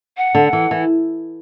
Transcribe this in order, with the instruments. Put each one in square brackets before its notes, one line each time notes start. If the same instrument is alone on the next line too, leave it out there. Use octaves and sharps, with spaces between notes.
[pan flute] F#5
[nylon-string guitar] D3
E3
E3